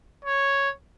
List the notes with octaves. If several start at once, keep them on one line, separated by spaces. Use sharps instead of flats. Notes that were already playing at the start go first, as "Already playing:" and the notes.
C#5